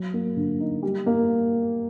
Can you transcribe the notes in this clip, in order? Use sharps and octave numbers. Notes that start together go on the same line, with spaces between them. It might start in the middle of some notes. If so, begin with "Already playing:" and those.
Already playing: F#3
A#3
D3
D#4
G3
A#3